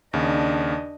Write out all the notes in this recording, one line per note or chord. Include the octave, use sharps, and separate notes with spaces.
D#2 C#3 D4 D#5